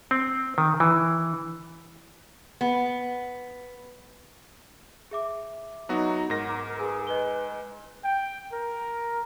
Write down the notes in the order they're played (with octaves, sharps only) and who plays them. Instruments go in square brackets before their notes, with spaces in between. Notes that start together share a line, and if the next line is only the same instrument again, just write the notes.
[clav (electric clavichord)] C4
D#3
E3
[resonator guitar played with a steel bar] B3
[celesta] G#4 E5 D6
[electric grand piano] F#3 B3 F#4 [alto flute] D#4
[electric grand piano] G#2 A#6 [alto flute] A#4 [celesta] F#5
[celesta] A#5 D6
[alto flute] G#4 [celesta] A#4 B4 G#5
[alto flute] B4 [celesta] D#5 G#5 G7
[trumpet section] G5
A#4